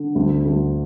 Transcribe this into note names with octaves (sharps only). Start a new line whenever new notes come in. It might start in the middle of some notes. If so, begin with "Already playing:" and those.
Already playing: D3
D2
D2